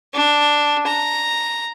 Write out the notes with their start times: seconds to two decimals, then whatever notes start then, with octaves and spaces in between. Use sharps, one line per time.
0.14 D4
0.87 A#5